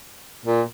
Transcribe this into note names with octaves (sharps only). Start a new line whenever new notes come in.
A#2